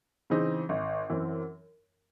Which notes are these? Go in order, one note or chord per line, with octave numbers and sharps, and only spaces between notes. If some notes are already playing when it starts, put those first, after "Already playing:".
C#3 E3 C4 D#4
G#1
F#2 E3 C4